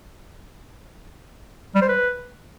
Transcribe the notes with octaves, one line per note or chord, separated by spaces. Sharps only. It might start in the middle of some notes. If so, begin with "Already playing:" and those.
G3
C5
B4